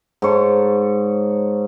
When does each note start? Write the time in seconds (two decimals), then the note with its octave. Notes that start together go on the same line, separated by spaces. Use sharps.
0.22 G#2 C#5 A5